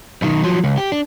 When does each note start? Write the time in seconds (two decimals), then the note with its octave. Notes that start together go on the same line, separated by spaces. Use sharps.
0.22 B1 D#3
0.43 F3 F#3
0.64 C#2
0.78 G4
0.92 D4